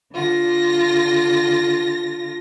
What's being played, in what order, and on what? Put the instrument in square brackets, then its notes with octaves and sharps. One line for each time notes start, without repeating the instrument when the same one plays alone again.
[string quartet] D3 F4 A#6